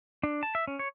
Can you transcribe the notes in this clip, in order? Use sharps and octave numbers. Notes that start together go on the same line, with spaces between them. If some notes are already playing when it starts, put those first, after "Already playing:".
D4
A5
E5
C#4
C#5